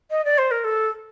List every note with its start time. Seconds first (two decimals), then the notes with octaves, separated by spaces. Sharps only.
0.11 D#5
0.25 D5
0.38 C5
0.51 A#4
0.64 A4